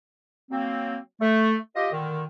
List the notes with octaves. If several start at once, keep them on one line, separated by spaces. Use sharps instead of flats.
F#3 A#3 C4
A3
F4 G4 D#5
A#2 D3 D#3